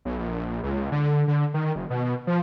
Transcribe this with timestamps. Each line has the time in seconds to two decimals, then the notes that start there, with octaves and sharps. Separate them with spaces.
0.05 B1
0.18 A#1
0.63 C#2
0.92 D3
1.28 D3
1.54 D#3
1.76 F#1
1.90 B2
2.27 F3